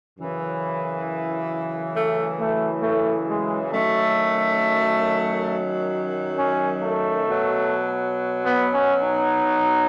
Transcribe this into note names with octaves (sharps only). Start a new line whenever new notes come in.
F#2 C#3 E3
A3
A3
A3
G#3
F#2 D#3 F#3 A3
C#4
A3
B2 F#3
B3
C#4
D#4